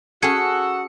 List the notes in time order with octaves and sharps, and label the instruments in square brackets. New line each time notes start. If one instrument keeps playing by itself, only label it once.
[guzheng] C#4 G#4 [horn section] F#4 F#5 [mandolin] A4 [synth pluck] C#7